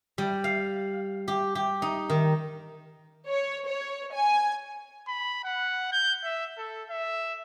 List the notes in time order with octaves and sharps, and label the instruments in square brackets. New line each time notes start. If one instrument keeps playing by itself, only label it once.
[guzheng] G3
F5
G4
G4
D#4
D#3
[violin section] C#5
C#5
G#5
[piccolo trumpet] B5
F#5
G6
E5
A4
E5